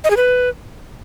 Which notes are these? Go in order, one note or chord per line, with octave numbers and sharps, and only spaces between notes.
D#5
G#4
B4